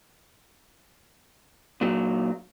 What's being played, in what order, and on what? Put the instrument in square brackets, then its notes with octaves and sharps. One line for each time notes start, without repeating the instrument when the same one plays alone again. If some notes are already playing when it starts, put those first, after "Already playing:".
[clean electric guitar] A#2 F#3